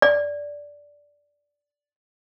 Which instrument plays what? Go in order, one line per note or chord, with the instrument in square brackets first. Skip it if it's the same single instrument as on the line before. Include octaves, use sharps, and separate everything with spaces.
[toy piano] D5